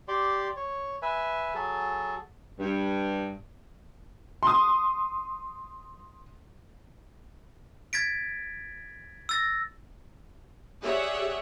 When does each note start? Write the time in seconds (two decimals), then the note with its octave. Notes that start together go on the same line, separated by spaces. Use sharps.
0.08 G4 D5 C6
0.57 C#5
1.02 B4 E5 G#5
1.55 F#3 G#4 A4
2.59 G2
4.43 C6 D#6
7.93 G#6 A6 B6 D7
9.29 E6 A6 A#6
10.82 G4 G#4 C#5 D5 E5 F#5